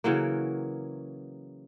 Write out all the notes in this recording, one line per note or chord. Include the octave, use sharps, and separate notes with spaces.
C#3 E3 F#3 A#3